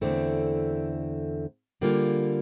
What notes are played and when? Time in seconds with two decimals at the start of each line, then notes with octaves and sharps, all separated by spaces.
0.01 E2 D3 A3 C4 E4
1.81 D3 G3 A#3 F4 A4